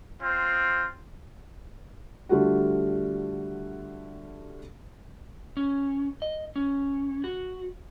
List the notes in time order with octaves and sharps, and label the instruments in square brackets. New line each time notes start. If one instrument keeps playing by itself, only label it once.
[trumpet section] C4 F4
[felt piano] D3 G3 A3 F4 F#4
[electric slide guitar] C#4
D#5
C#4
F#4